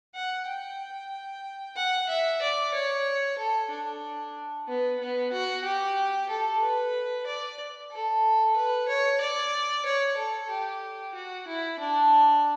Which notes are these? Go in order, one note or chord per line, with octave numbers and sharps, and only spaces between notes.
F#5
G5
F#5
E5
D5
C#5
A4
D4
B3
B3
F#4
G4
A4
B4
D5
A4
B4
C#5
D5
C#5
A4
G4
F#4
E4
D4